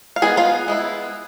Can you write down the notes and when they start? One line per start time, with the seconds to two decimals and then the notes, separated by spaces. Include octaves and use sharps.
0.16 F5
0.22 G#3 B3 E4 G#4 G#5
0.37 F4 F5
0.68 G#3 B3 E4